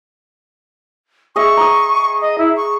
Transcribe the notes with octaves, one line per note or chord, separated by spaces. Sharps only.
G#4 D#5 E5 C#6
A#5 D#6
D#5
E4
C#6